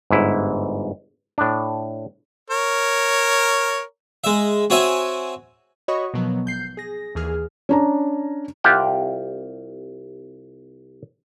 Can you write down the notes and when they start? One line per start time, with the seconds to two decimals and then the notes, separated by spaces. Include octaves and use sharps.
0.11 G1 G#2 E4
1.38 A2 D4
2.50 A#4 C#5
4.24 G#3 E5
4.70 C4 F#4 C#5 E5 G#5
5.88 F#4 C#5 D#5 B5 C#6 D#6
6.14 B2 D#3 F3 F#3 B3
6.45 G#1 G6 C7
6.77 G#4 A#6
7.15 D#2 E3 G#4 F6
7.69 C#4 D4 A#5
8.64 C2 F4 G4 F#5 G5